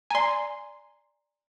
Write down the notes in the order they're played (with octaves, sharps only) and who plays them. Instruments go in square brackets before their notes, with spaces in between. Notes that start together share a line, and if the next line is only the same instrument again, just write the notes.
[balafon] D5 A#5 [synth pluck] G#5 C6